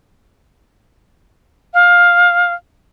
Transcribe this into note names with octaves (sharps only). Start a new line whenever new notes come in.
F5